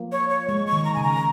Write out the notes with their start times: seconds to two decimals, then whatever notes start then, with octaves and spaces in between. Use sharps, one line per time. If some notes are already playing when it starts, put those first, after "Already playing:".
Already playing: F3 A#3
0.12 C#5
0.30 C#5
0.48 G#3 C#6
0.67 C#6
0.73 D#3
0.85 A#5
0.94 C#3 G#5
1.04 A#5